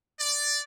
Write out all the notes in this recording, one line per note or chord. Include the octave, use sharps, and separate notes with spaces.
D5